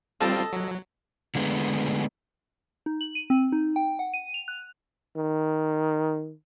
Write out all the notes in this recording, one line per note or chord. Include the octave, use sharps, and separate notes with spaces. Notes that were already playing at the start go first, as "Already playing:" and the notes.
G3 C4 F4 A4 D#5
F#3
D3 G#3 A3 B3
D#4
F#7
D#7
C4
D#4
G5
F#5
D#7
F7
F#6
D#3